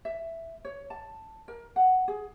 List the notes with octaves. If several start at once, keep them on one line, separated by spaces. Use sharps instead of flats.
E5
C#5
A5
A#4
F#5
G#4